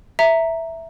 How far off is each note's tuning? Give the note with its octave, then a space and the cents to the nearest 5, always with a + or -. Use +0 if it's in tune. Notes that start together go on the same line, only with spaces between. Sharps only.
E5 +0 A#5 -5